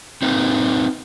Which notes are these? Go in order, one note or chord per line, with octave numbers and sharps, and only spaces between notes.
C4 D#4 A#4 B4